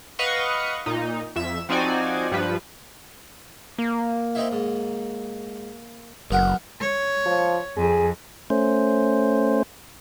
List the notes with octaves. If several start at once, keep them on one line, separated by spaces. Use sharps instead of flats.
B4 D#5 F5 F#5 C#6
A#2 D#4
F2 E5 E7
F3 C4 D#4 F#4 D5 G#5
G2 F3 G3 B4
A#3
C4 D#4 E4
G#2
F#1 B1 A#4 F#5
C#5
F3
F2 G#4
A3 C#4 C5